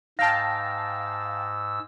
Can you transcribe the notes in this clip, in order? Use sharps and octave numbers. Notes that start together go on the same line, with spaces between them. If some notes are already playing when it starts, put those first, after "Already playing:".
G#2 F5 G5 A5 E6 A#6